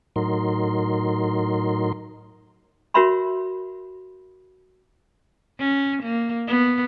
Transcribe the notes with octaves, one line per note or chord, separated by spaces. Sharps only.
A2 F#3 D#4 A#4 C6
F#4 A#4 C#5 E5 B5 C6
C#4
A#3
B3